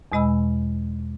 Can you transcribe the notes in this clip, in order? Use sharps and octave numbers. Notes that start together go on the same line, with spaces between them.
E2 B2 G#3 D#5 B5 E6